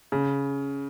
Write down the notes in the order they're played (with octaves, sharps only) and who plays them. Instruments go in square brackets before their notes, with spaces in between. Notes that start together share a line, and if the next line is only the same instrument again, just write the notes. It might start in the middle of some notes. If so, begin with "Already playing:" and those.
[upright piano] C#3